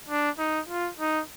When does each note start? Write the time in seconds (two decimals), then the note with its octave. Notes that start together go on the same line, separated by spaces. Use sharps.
0.09 D4
0.39 D#4
0.69 F4
1.00 D#4